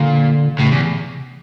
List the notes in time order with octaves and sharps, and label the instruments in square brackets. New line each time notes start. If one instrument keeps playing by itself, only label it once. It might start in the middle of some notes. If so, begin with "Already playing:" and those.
Already playing: [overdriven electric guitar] A#2 [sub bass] D3
[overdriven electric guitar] A2 [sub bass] C#3
[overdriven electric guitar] E2 [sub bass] C3